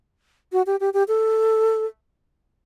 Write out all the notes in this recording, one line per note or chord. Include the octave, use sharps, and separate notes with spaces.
F#4
G4
G4
G4
A4